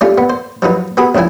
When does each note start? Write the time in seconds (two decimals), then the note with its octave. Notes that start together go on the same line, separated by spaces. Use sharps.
0.01 G3 A3 C#4 F4
0.18 B3
0.30 C5
0.62 F3 F#3 D#4 B4
0.97 B3 F#4 G#4 B5
1.15 C#2 C#3 F3 E4 G#5